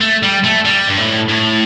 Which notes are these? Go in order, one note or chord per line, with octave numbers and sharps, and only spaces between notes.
A3
G3
A3
G3
G2
A2
A2